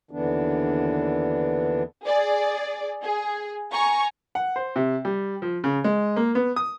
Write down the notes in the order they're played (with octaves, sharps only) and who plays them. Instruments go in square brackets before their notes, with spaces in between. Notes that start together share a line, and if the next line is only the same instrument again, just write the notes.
[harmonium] D#2 D3 E3 B3 D4
[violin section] G#4 D5
G#4
G#5 A#5 C#6
[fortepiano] F#5
C5
C3
G3
F3
C#3
G#3
A#3
B3
D#6